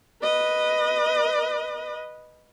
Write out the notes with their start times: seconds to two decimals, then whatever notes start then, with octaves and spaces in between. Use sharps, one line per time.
0.22 B4 D#5